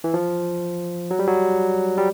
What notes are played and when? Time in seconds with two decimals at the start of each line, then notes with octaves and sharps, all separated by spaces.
0.04 E3
0.14 F3
1.11 F#3
1.19 G3
1.27 F#3
1.98 G3